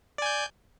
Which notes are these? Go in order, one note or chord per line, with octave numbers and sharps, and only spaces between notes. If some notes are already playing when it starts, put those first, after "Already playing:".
D5 G#5 G6